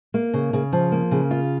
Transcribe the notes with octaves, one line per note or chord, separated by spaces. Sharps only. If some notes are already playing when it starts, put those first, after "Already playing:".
A#3
C#3
C#3
F3
A#3
C#3
F4